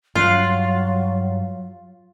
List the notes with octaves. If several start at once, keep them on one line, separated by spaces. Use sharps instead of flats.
G2 F#3 F4 F5 F#6